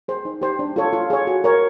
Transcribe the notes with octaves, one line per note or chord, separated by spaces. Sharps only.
G#4 C5
D#4
G4 C5
D4
F4 A4 C#5
F4
G#4 C#5
F#4
A#4 C#5